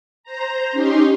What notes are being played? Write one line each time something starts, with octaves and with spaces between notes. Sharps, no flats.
C5 A#5
C#4 D#4 G4 C6